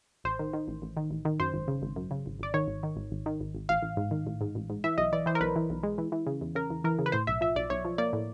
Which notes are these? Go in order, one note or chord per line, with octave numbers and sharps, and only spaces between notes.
A1 C5
D#3
D#3
A1
A1
D#3
A1
D#3
F#2 C5
G#1
C#3
G#1
F#2
C#3
G#1
G#1 D5
D#3 C#5
G#1
D#3
G#1
G#1
D#3
G#1
G#1
A1 F5
A1
G#2
D#3
A1
G#2
A1
G#2
E3 E5
B1 D#5
E3 D5
E3 C5
A#4
B1 B4
E3
B1
G#3
E3
E3
C#3
E2
C#3 A#4
E2
E3 A#4
C#3
B4
A2 C5
B1 E5
F3 E5
B1 D5
B1 C#5
F3
A#3 D5
A2